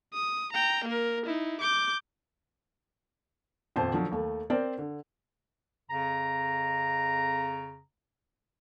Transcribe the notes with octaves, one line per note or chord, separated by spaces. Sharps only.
D#6
G5 A#5
A#3 A#4
D#4 E4
D6 G6
D#1 F2 C5 A5
D3 F3 F#3
D#2 A3
C4 A#4 C5 D5
D3
F2 C#3 A#5